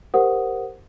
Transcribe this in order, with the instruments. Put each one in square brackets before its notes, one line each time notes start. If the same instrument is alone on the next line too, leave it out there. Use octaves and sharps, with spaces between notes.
[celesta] G4 A#4 C5 F#5 D#6